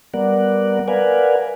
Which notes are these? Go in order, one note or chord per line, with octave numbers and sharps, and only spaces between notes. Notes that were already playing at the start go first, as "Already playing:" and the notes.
G3 B3 A#4 D5 F#5
A#4 B4 D5 F5 F#5 G#5